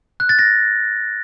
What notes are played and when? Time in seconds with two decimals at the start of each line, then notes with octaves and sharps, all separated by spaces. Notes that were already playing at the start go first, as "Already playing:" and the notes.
0.20 F#6
0.29 A6
0.39 A#6